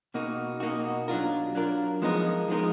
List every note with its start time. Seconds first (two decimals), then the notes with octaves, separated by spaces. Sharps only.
0.14 B2 A#3 D#4 F#4
0.60 B2 A#3 D#4 F#4
1.08 F#3 D4 F4 A#4
1.55 F#3 D4 F4 A#4
2.02 F3 G#3 B3 D#4 A#4
2.48 F3 G#3 B3 D#4 A#4